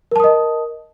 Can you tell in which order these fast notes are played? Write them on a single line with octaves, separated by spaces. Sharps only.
A#4 A5 D#6 D#5